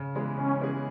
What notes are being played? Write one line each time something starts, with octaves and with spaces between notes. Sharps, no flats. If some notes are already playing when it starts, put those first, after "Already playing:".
Already playing: C#3
E3 G#3 B3 G#4
C#3 C#4
E3 G#3 B3 G#4